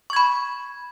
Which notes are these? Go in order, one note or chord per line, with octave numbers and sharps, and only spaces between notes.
B5 C#6 G#6